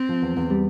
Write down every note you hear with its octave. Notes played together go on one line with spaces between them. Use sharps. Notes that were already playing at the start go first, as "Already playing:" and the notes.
Already playing: C4
F3
E2
E2
G3